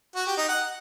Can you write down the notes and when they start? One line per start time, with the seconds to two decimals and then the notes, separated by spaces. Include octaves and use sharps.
0.15 F#4
0.26 G4
0.37 D#4
0.48 F#5